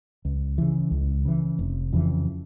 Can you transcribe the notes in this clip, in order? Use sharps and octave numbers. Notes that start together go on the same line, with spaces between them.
C#2
C#3 E3
C#2
C#3 E3
F1
F2 C#3 E3